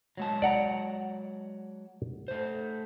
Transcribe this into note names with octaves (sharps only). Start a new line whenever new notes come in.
F#3 G#3 A5
D5 F#5 A#5
A3 C5